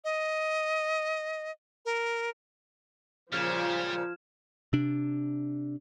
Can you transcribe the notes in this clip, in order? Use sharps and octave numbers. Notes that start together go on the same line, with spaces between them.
D#5
A#4
A#2 C#3 F3 G3 F6 G#6 E7
C3 D4